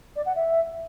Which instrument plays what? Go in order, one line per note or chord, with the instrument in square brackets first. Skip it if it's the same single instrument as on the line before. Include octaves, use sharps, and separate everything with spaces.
[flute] D5
F#5
E5